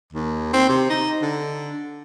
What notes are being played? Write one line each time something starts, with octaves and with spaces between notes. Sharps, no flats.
D#2
C4
C3
D#4
D3